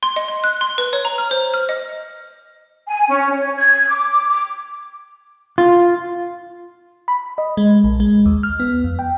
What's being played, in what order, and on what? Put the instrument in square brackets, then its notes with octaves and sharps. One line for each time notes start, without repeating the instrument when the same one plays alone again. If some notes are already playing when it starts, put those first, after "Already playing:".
[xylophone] C6
D#5
C6
F#6
C6
B4
C#5
A#5
F6
C5
F6
D#5
[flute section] G#5
C#4
C#5
G#6
D6
D6
[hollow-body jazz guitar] F4
[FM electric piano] B5
D#5
G#3
A#1
G#3
D#2
F6
B3
F2
G5